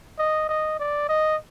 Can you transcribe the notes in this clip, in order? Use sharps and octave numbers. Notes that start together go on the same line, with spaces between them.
D#5
D#5
D5
D#5